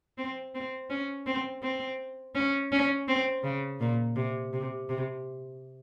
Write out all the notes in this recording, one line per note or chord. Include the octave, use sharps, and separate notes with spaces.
C4
C4
C#4
C4
C4
C#4
C#4
C4
C#3
A#2
C3
C3
C3